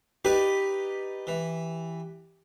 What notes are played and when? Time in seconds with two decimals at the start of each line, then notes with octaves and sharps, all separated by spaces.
0.25 D#4 G4 B4 D5
1.27 E3